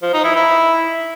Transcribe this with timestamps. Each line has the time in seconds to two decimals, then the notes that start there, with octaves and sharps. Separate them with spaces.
0.02 F3
0.13 D#4
0.24 E4
0.35 E4